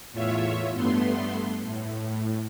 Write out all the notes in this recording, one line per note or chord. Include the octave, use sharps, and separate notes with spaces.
E2 A2 F4 C#5 E5
G2 A3 B3 C6
A2